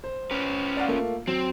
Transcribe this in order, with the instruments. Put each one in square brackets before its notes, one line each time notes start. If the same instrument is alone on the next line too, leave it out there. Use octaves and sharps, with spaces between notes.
[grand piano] C5
[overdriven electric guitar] C#4 B4
[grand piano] D5 F5 F#5
A3 A#3 F4
[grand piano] F#3 [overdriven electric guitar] C4